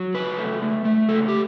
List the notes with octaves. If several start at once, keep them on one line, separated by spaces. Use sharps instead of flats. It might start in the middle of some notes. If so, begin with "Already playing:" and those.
Already playing: F#3
C#3 B4
A3
A3
A3
C#3 A4
G4